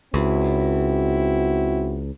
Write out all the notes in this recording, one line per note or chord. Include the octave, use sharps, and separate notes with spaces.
C#2 C4 E4 F#4